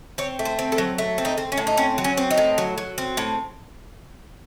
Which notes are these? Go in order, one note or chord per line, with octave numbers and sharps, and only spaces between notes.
C4 C#5
A3
C5
C4
A4
F#3
A3
C4
D#4
C4
C#4
A2
D#4
C4 C#4
F#3
C#4
C4
D#4
A2
F#3
F#3
C4
A2